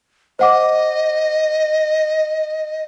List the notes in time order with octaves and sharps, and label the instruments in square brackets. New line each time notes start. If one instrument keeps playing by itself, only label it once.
[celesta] C5 F#5 D6 [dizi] D#5